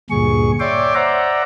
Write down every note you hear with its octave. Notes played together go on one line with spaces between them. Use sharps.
D2 G2 A#2 G#4 C#6
C#5 D5 E5 G5 C6 D6
C5 D5 E5 F#5 A#5